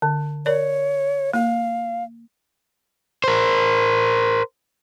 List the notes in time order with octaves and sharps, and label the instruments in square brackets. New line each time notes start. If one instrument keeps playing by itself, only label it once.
[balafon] D3
[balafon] A#4 D5 [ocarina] C#5
[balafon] A#3 [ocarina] F5
[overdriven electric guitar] A#4 C5